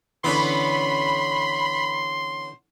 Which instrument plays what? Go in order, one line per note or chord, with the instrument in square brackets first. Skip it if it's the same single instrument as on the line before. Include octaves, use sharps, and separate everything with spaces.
[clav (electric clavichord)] D3 E3 [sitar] B3 C#4 [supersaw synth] B5 [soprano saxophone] C6